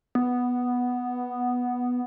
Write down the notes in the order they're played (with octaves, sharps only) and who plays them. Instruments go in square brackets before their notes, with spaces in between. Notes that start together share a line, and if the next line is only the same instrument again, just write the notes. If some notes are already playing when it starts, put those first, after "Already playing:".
[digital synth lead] B3